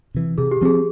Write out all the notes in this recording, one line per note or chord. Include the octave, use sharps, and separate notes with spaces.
C3 E3
C3 G#4
G4
F3 C4 G#4